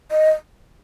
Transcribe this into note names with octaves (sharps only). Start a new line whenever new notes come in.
D#5